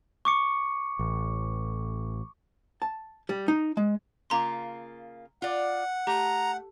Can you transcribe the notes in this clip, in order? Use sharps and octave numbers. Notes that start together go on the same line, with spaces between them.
C#6 D6 C#7
A1
A5
G3
D#4
G#3
C#3 A#3 F4 A#5 C6
F4 D5 F#5
A3 G4 A#5